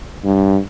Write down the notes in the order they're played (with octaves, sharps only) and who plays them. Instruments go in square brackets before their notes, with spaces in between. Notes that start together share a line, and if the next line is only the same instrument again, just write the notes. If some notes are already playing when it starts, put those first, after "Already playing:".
[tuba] G2